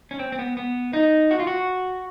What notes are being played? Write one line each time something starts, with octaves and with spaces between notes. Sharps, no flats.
C#4
C4
C4
B3
B3
D#4
F#4
F4
F#4